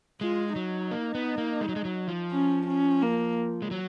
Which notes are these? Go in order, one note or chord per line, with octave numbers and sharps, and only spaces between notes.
G#3 F4
F#3 D#4
A#3
B3
A#3
G#3
F#3
G#3
F#3
F3
C#4
C#4
A#3
G#3
F#3